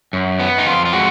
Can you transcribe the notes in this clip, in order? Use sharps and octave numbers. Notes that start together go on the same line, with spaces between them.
F#2
B3
D#4
F2 F4
F4
G#3 F#4